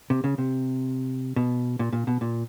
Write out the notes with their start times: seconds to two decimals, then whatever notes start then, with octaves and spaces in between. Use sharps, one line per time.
0.10 C3
0.24 C#3
0.38 C3
1.36 B2
1.79 A#2
1.93 A#2
2.07 B2
2.21 A#2